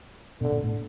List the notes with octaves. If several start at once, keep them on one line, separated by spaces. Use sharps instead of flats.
B2 D3
A#2
A2